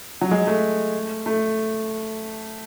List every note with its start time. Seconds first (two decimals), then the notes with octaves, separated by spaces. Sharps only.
0.21 F#3
0.31 G#3
0.47 A3
1.26 A3